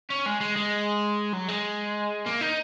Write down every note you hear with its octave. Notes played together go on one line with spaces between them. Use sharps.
C#4
G#3
G#3
G#3
F#3
G#3
A#3
D#4